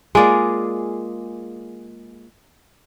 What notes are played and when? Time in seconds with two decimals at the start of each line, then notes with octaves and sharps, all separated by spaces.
0.15 G#3 A#3 F4 G#4 D5 G#5